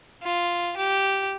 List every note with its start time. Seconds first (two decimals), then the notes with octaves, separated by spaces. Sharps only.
0.23 F4
0.77 G4